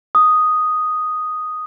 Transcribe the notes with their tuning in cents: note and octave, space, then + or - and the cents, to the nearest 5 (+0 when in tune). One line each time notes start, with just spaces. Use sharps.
D#6 +0